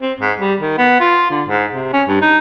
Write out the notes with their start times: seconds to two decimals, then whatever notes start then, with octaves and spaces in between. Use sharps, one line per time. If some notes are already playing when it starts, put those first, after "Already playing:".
0.01 C4
0.20 G#2
0.40 G3
0.61 D#3
0.78 B3
1.00 F4
1.30 D3
1.48 G#2
1.73 C3
1.93 C#4
2.07 G2
2.21 D#4